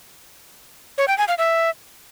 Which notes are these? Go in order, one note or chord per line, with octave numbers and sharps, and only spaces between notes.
C#5
G5
G#5
F5
E5